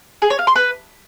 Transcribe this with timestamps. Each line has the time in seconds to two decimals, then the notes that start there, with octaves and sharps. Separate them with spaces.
0.22 G#4
0.30 C#5
0.39 F5
0.47 C6
0.56 B4